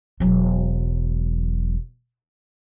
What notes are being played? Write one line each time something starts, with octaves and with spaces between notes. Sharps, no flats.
E1 F#3